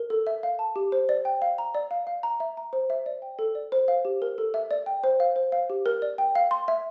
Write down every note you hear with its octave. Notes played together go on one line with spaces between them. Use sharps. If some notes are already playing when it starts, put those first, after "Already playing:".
Already playing: A#4
A4
E5
F5
A5
G4
C5
D5
G5
F5
A#5
D5
F5
F5
A#5
E5
A#5
C5
E5
D5
G5
A4
D5
C5
F5
G4
A#4
A4
E5
D5
G5
C5
F5
C5
F5
G4
A#4
D5
G5
F5
C6
E5